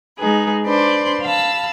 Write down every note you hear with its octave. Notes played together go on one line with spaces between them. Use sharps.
G#3 D#4 G#4 B4
D4 B4 C5 D5 C6
F5 A5 B5 E6